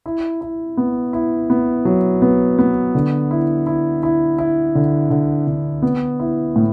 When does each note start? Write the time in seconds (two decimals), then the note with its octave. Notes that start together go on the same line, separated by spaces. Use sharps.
0.06 E4
0.41 E4
0.77 B3
1.13 E4
1.50 B3
1.85 F#3
2.22 B3
2.59 B3
2.95 D3
3.31 E4
3.67 E4
4.03 E4
4.38 E4
4.75 D3
5.10 D3
5.47 D3
5.82 B3
6.20 E4
6.56 A2